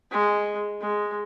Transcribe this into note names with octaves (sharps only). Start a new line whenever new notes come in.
G#3
G#3